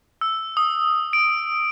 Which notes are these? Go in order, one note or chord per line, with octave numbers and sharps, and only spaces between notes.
E6
D#6
D7